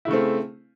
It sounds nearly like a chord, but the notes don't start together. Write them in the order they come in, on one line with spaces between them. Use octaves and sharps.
E4 C#3 A3 C4